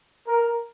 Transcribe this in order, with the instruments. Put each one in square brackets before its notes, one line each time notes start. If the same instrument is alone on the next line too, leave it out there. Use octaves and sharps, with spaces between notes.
[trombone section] A#4